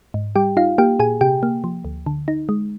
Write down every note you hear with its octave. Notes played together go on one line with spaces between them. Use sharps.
G#2
G3 G4 G5
D#4 F4 F5
A#3 G4 G5
A#2 G#4 G#5
C3 G4 G5
A#3
F3
D2
D3
D#4
G#3